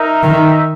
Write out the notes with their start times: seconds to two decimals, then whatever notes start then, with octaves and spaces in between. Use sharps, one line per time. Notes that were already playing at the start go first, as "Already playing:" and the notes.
Already playing: D#4 A#4 E5
0.23 D#3